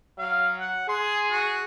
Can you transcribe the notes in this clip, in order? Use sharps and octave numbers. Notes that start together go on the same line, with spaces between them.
F#3 F5
F#5
G#4 C6
F#4